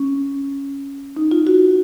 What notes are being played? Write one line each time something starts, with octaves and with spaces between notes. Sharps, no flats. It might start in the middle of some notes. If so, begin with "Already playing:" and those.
Already playing: C#4
D#4
F4
F#4